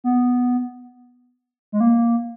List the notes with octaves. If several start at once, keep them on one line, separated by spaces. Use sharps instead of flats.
B3
G#3
A#3